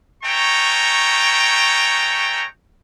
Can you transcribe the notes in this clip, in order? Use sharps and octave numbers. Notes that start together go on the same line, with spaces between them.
G#3 A3 C#5 G5 A#5 C#6